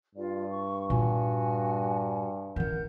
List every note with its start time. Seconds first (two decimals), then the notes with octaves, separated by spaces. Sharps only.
0.15 G2 F4 D5
0.51 C#6
0.90 A#2 G3 F#4 F#5 G#5
2.56 A1 D#3 A#4 F#5 G6